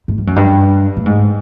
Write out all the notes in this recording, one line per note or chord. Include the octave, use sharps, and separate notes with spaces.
G#2
G2
F#2
G2
A2
G#2